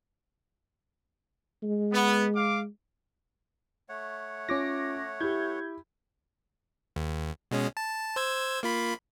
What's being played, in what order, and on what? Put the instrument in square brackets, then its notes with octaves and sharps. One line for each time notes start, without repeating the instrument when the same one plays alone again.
[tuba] G#3
[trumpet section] B3
F5 D6
[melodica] A3 C#5 F#5
[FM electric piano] C#4 D6 A#6 [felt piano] F4
[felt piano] E4 G4 [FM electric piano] G6 G#6
[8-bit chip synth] D#2
B2 G#3 C#4
A5
C5 E6 G#6
A#3 F4 B5